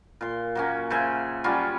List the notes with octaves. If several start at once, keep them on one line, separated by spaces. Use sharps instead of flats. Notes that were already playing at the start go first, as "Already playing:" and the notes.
A#2 C6
F#3 A#3 C#4
C#3 C5 E5 G#5
F#3 G3 C#4 F4